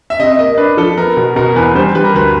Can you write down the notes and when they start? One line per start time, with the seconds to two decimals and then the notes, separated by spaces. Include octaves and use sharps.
0.10 E5
0.19 C3 D#5
0.39 A#3 D#5
0.58 D4 B4
0.77 F3 A4
0.97 B3 A#4
1.17 B2
1.36 B2 A#4
1.56 E2 B4
1.75 G3 C5
1.95 G3 B4
2.04 A#4
2.14 D2 B4